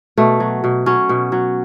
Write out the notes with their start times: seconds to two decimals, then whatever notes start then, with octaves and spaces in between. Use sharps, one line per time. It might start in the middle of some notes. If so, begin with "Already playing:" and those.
0.18 B2 A3
0.40 F#3
0.64 B2
0.86 F#3 C#4
1.09 B2
1.32 F#3